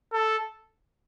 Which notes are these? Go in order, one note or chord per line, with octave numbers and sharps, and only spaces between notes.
A4